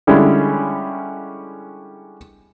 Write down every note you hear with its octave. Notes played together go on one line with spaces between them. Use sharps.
D3 G3 G#3 C#4 E4